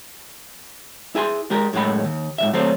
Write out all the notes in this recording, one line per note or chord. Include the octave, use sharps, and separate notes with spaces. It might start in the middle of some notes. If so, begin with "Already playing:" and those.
E4 G#4 G#5 B5 C6
G#3 G4 A#4
F#2 A2 G#3 F#5 B5
D#2
G#2 C#3 E5
F#3 A3 C4 A4 C5 C#5